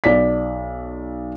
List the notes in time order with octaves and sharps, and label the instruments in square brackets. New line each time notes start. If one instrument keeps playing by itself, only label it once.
[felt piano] B1 D5 B6